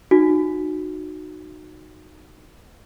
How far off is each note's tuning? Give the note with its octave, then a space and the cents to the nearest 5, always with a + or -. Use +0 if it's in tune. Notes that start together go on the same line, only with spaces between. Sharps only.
D#4 -20 F#4 -15